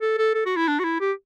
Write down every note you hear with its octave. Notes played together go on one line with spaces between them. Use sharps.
A4
A4
A4
F#4
E4
D4
F#4
E4
G4